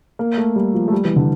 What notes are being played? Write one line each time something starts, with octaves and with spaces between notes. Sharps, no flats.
A#3
A3
G3
F3
A3
G3
E3
D3